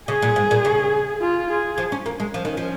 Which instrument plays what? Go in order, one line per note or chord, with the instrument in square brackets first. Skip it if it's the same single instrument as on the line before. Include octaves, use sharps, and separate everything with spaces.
[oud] C#3 [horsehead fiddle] G#4
[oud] A#2
G#2
A#2
C#3
[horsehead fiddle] F4
G#4
[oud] F3
C#4
A#3
G#3
[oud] F3 [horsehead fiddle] C#4
[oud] D#3
F3